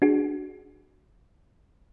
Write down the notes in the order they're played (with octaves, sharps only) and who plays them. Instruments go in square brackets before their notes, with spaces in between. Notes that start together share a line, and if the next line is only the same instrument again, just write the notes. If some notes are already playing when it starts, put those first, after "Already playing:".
[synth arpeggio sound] D4 F#4 G#4